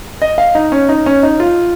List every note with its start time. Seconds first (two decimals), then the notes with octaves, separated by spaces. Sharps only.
0.22 D#5
0.38 F5
0.55 D#4
0.72 C#4
0.89 D#4
1.06 C#4
1.23 D#4
1.40 F4